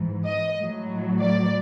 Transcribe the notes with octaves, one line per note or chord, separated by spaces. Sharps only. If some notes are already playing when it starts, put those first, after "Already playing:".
Already playing: G#2 E3
D#5
A2 F#3
D5